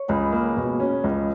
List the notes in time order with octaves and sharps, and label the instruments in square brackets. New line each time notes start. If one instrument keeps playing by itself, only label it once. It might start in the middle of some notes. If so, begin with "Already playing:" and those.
Already playing: [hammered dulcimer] C#5
[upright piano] C#2 [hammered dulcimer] G#4 B4
[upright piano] A#3
B2
C#4
C#2